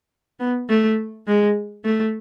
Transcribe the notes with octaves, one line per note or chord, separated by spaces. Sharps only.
B3
A3
G#3
A3